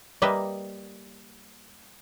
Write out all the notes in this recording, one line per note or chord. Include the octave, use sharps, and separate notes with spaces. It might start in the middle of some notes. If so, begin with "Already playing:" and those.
G3 A#3 B4 D#5 E5